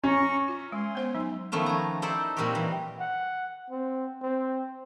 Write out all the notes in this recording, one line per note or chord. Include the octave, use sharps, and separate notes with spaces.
C#4 A#5 C#6
F4 E5
G#3 G#5 C6
B3 C5 F#5
F#3 D#4
D#3 F3 A3 B3 C#4
G#5 A#5
D#4 E4 A4 C5 D5
A#2 G3 C4 D#4 F#4 G4
E3
F#5
C4
C4